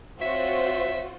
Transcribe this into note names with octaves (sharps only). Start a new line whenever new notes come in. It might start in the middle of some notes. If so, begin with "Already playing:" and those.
C4 F4 F#4 C5 C#5 E5